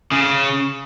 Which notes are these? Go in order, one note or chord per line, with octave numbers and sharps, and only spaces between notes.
C#3